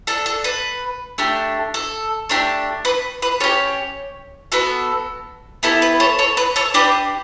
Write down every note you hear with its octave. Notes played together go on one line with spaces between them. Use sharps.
D4 A4
A4
B4
A3 D4 G4
A4
A3 D4 G4
B4
B4
C#4 G4 A4 C#5
B3 F#4 A4
B3 E4 G4 A4
B4
A4 C#5
A4 C#5
B4
A4 C#5
D4 G4 B4 D5